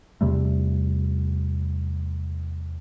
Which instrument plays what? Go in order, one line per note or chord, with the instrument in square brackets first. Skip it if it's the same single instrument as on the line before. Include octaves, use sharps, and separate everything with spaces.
[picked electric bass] E2 C3 G3 A3